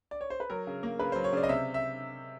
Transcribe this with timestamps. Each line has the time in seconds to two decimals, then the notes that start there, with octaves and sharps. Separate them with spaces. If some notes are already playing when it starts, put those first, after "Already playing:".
0.11 D5
0.21 C#5
0.30 C5
0.40 B4
0.50 F#3 A#4
0.67 C#3
0.83 A#3
0.99 C#3 B4
1.12 F#3 C5
1.24 C#5
1.33 C#3 D5
1.43 D#5
1.49 C3 E5
1.74 E5